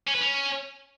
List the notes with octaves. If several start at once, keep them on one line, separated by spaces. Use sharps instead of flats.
C#4
B4
C#4